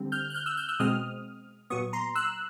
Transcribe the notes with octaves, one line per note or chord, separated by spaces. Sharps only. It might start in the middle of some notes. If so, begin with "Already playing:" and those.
Already playing: D3 G3 C4
F6 G6
F#6
F6 G6
E6 F#6
F6 G6
E6 F#6
B2 G#3 C4 D#6 F6
A#2 F#3 B3 C#6 D#6
A#5 C6
E6 F#6